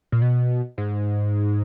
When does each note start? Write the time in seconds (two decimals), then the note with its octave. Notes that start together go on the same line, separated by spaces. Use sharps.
0.12 A#2
0.22 B2
0.78 G#2